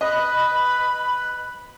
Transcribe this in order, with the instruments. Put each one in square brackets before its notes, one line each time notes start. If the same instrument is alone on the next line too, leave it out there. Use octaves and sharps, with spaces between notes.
[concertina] B4 [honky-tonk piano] D#5 [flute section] B5